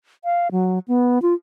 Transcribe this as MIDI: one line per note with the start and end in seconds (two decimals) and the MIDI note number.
0.24 0.48 77
0.52 0.79 54
0.88 1.22 59
1.22 1.34 65